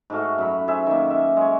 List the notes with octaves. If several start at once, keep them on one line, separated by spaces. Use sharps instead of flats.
G#2 A3 F#4 F5
F#2 B5
G#4 C5 E5
D#3 A#3
E5
G#3 C#5